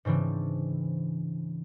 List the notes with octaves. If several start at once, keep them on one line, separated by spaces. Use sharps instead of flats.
G#2 C#3 E3 C4 D4